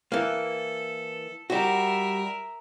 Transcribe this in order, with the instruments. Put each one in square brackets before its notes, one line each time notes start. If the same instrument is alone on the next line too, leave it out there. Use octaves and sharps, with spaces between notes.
[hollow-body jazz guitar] E3 A#3 [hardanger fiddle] A4
[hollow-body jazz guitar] G3 F#4 [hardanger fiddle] A#4 E5